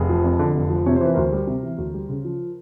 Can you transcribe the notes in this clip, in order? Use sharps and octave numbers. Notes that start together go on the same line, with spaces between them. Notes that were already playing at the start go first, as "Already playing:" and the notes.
Already playing: F1 G#4
F3
F2
D3
F1
F3
C3 C#5
C5
E3 B4
D2 A#4 C5
G3
C3
E3
D2
G3
C#3
F3